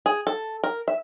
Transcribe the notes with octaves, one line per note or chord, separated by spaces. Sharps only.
G#4
A4
A#4
E5